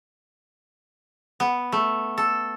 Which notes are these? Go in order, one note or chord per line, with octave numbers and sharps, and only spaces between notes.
B3
A3
A4